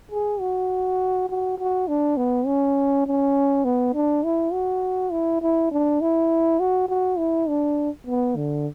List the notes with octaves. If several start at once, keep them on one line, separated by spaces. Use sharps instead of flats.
G#4
F#4
F#4
F#4
D4
B3
C#4
C#4
B3
D4
E4
F#4
E4
E4
D4
E4
F#4
F#4
E4
D4
B3
D3